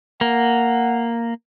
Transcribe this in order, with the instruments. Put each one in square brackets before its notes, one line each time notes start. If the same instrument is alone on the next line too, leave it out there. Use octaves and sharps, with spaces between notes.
[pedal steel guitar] A#3 [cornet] F#5